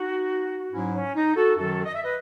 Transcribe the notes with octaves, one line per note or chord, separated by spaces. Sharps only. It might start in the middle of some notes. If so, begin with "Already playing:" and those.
Already playing: D#4 F#4
G#2 F#3 C#4 E4
C#4
D#4
F#4 A4
F#2 D#3 F#3 F#4 A4
D#5
E5
B4 D#5